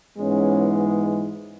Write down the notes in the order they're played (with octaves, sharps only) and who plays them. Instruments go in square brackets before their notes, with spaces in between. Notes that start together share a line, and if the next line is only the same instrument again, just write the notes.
[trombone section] G#2 E3 G#3 B3 C#4